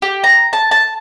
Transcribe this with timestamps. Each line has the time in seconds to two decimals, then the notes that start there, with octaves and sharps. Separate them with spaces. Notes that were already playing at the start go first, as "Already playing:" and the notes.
0.02 G4
0.24 A#5
0.53 A5
0.71 A5